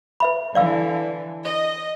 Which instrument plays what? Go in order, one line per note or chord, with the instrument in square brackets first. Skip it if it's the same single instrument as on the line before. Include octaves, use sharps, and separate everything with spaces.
[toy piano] B4 E5 B5
[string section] D3 E3 [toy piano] D5 F5 E6
[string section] D#5